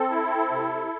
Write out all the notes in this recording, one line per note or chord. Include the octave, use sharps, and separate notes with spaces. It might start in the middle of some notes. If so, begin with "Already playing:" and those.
Already playing: C4 A4
E4
C3